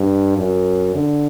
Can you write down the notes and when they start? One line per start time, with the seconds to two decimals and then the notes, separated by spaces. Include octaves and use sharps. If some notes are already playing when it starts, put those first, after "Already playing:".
Already playing: G2
0.37 F#2
0.95 D3